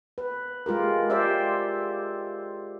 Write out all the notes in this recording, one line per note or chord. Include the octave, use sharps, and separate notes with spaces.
B4
G#3 F4 G4 A#4
G4 C5 D5 E5